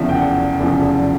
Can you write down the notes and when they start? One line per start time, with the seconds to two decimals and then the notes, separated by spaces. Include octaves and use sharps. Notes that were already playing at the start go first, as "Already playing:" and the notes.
Already playing: F1 E2 C#3 F3 E5
0.09 G5
0.15 F#5
0.60 F1 E2 C#3 F3